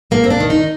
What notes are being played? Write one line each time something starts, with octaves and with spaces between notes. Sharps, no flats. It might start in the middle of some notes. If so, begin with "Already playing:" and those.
G2 A#3
C4
D4
D#3
D#4